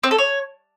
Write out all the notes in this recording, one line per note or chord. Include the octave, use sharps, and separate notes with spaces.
C4
A4
C#5